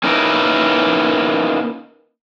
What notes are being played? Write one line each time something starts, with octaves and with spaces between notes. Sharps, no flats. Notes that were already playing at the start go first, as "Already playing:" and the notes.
A#3 C#4 D#4 E4 A#4 B4